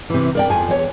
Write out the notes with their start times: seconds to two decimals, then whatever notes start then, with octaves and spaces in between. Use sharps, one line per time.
0.10 C3 E3
0.35 A#4 D5 G5
0.50 F2 F3 G#5
0.71 E2 C#5